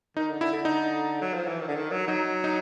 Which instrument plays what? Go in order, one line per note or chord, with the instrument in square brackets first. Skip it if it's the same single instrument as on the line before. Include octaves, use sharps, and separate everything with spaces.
[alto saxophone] D#3 [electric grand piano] D#4
[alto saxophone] D3
[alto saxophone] D3 [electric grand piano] E4
[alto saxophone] D3
[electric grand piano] D#4
[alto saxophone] F#3
F3
E3
D#3
D3
D#3
F#3
[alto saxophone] F#3 [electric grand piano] D#4
[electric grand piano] D#4